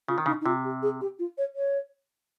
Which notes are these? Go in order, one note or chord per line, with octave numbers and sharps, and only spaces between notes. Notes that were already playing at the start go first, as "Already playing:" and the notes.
C#3 F4
D#3
C#3 D#4
D#4
C3 F4
G4
G#4
G4
F4
C#5
C#5